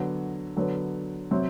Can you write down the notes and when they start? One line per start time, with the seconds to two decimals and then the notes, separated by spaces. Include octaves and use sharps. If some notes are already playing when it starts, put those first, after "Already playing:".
Already playing: D3 F#3 B3 F#4
0.57 D3 F#3 B3
1.31 C3 F#3 C4